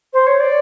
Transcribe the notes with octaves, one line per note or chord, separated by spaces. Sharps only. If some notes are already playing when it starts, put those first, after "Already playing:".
C5
C#5
D5